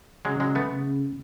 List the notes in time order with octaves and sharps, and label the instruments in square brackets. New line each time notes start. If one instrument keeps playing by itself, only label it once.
[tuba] C#3 [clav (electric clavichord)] F#3 G#3
[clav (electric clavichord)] F#3 G#3
A3 B3
[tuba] C#3